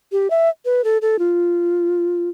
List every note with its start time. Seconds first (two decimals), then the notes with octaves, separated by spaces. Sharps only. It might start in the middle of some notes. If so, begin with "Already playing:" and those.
0.12 G4
0.30 E5
0.65 B4
0.84 A4
1.02 A4
1.19 F4